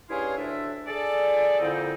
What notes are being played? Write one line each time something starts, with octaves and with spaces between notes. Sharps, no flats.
G2 C#4 E4 G#4 F5 C6
D2 A2 D4 E5
G#4 A4 D5
F2 A#2 D3 C4 D#4 E4